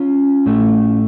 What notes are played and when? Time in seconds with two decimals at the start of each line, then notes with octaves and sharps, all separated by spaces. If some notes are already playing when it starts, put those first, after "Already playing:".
Already playing: C#4 F4
0.46 A2 A3